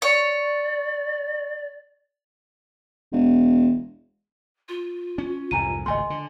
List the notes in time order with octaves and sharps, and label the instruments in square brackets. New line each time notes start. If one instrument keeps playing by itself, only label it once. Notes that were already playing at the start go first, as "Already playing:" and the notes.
[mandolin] C#5 [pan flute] D5
[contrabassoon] E1
[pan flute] F4
[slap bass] C#4
[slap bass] C2 F2 G#2 [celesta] G#5 A#5 D#7
[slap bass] G#1 C#2 A3 [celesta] D#5 G#5 C6
[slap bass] D3